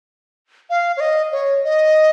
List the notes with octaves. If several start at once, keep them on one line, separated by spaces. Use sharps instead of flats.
F5
C#5
D#5
C#5
D#5